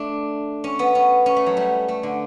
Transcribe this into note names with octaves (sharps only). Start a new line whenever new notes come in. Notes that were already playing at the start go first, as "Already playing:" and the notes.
Already playing: A3 D4
C#4
B3
C#4
C#4
A3
F#3
G3
A3
D3